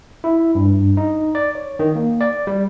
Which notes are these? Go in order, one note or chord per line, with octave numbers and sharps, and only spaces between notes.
E4
G2
D#4
D5
C#5
D#3
A#3
D5
G3